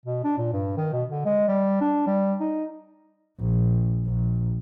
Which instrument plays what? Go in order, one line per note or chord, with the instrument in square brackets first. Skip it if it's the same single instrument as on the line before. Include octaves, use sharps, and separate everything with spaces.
[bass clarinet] B2
D4
A#2
G2
D#3
B2
D3
G#3
G3
D4
G3
D#4
[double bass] A#1
A#1